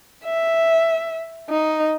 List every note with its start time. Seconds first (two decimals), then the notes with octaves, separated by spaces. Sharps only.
0.25 E5
1.49 D#4